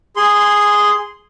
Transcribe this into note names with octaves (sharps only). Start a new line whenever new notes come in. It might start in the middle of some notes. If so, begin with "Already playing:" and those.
G#4 C6